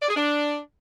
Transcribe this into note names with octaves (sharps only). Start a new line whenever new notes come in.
D5
G#4
D4